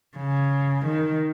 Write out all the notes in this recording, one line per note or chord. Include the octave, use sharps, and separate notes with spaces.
C#3
D#3